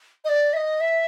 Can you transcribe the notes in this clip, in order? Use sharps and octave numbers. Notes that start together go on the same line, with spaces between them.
D#5
D5
E5
D#5
E5